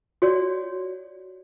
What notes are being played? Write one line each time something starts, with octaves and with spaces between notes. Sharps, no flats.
F#4 C#5 D5